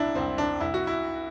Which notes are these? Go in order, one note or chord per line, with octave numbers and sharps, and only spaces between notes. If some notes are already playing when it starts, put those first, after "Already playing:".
Already playing: C2 D4 E4
C2 C4
D4
C2 E4
F#4
E4